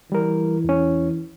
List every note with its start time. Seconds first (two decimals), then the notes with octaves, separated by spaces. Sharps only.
0.12 E3 G3 A#4
0.64 E2 C#4